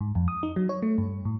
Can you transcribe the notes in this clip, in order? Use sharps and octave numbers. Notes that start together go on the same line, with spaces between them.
G#2
F2
D#6
D#4
F#3
C#5
A3
G2
A2